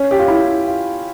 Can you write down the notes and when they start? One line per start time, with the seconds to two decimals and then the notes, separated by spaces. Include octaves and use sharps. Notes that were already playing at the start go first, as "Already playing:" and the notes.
Already playing: C#4
0.11 G4
0.19 F4
0.28 E4
0.67 F4